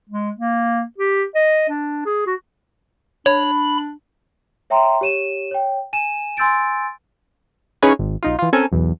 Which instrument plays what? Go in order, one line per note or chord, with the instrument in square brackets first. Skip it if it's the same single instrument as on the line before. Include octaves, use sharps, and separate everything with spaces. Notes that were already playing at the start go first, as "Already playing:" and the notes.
[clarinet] G#3
A#3
G4
D#5
D4
G#4
F#4
[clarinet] D4 [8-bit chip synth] C#5 [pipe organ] B5
[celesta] C#5 E5 G5 A#5 C6
G4 C#5 D#7 E7
C#5 G5
G#5 D#7 E7
G#5 C6 E6 G6 A6 D7
[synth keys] C#4 D#4 E4 G#4 B4 C#5
G#1
B1 D#4 F4
E3 F4
C4 C#4 A4 A#4 G#5
B1 E2